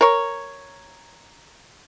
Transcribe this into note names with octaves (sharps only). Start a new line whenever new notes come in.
A#4 C#5